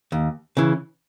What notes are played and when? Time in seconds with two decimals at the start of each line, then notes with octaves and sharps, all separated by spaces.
0.12 D#2
0.57 C#3 E3